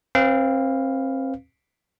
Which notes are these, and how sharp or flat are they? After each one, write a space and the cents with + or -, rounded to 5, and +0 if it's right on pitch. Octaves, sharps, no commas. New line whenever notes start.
C4 +35 B4 +0 F5 +0